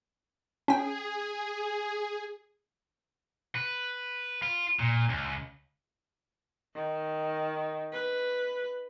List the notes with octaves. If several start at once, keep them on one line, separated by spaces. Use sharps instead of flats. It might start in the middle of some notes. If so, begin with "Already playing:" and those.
C#4 G#4 G5
B4
F4
A#2
C#2
D#3
B4